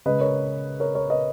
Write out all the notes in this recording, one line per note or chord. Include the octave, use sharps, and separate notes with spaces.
C#3 G#3 B4 D#5
A#4 C#5
A#4 C#5
A#4 C#5
B4 D#5